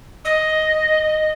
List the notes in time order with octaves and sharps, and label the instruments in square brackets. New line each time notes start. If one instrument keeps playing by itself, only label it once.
[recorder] D#5